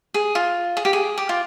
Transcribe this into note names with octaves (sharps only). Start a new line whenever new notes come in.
G#4
F4
G#4
G4
G#4
G4
F4